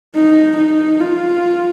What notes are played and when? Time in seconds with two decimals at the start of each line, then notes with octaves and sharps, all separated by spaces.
0.15 D#4
0.57 D#4
1.00 F4